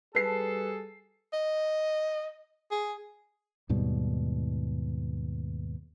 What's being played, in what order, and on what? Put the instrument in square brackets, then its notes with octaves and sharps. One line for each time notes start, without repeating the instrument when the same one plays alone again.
[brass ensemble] G3 G#4 A4 [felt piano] B4 C7
[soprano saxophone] D#5
G#4
[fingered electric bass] D#2 G#2 B2 G3